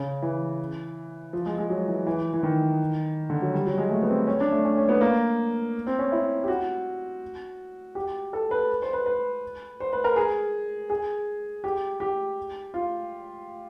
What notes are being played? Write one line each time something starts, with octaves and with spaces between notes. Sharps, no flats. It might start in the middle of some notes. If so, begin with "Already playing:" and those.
Already playing: C#3
E3
F3
G#3
G#3
F#3
E3
E3
E3
D#3
D3
F#3
G3
F#3
G#3
A3
B3
C4
C#4
D4
A3
C#4
C#4
B3
A#3
C4
C#4
E4
G4
F#4
G4
A4
B4
C5
B4
B4
C5
B4
A#4
G#4
G#4
G4
G4
F4